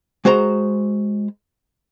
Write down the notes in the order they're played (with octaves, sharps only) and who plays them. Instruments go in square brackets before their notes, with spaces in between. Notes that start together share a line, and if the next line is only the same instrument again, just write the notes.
[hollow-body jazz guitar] G#3 F#4 C5 A#5